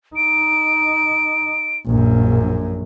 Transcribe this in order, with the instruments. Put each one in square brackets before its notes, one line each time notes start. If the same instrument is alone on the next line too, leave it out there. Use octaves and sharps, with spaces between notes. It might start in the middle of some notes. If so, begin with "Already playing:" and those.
[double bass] D#4 [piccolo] D7
[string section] A#1 [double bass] F#2